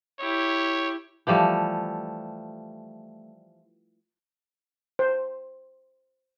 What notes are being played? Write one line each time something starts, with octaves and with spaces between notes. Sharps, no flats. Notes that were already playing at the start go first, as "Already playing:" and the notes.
E4 G4 C#5
E3 F3 G3 A3
C5